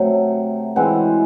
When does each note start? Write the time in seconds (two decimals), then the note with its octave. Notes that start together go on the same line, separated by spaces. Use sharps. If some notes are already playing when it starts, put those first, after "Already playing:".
Already playing: C3 F#3 A3
0.76 E3 G#3 C4 F#4